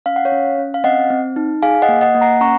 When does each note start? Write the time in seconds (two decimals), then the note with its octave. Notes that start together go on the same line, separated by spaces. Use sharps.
0.06 C#4 F5
0.16 F#5
0.25 C#5 F5
0.32 C#4
0.58 C#4
0.74 F5
0.84 C4 D#5 F#5
1.10 C4
1.36 D#4
1.62 G#4 F5 G#5
1.82 D#5 F#5
1.89 A#3
2.01 D#5 F#5
2.15 A#3
2.21 F#5 A#5
2.41 C#4 A#5 C#6